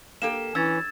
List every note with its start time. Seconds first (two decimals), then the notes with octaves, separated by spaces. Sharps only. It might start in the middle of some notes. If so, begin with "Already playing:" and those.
0.22 A#3 G4 A4 E7
0.55 E3 C#4 E6 G#6 A6